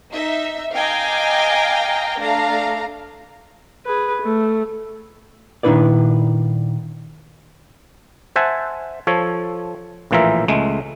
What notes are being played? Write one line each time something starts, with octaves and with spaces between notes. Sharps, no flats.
D#4 E5
D#5 F5 G5 G#5 A#5 D6
A3 D4 F5 A#5
G#4 B4
A3
A#2 D#3 D4 E4 B4 D5
C5 E5 F#5 G#5 A5
F3 A4 C#5
A#1 A2 E3 F4 A#4 E5
C#2 G#3 A3